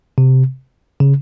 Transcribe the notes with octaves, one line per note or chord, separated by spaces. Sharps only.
C3
C#3